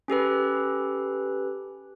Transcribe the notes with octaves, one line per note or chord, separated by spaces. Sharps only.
C#4 G4 A4 B4